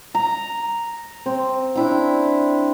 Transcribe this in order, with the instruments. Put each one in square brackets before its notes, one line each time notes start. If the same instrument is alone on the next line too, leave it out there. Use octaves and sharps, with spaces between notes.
[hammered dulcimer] A#5
C4
D4 E4 G5